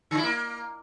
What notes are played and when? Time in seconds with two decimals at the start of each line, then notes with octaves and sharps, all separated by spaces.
0.11 D3
0.17 E4
0.23 A#3